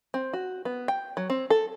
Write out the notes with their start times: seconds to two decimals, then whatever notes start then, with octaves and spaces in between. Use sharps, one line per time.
0.14 C4
0.33 F#4
0.65 B3
0.88 G5
1.17 F#3
1.30 C4
1.50 A4